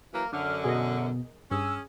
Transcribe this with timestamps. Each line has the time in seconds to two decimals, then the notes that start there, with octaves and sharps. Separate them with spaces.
0.14 E3 F#3 A#3 A#5
0.33 F#2 D3 D4 F6
0.64 B2 G#4 A#4 D#5
1.51 G2 C#4 G#4 E6